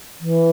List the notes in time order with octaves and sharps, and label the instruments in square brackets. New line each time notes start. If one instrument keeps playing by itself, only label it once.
[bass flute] E3